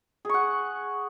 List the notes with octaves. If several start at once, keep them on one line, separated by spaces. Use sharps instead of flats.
G#4 F#5 C#6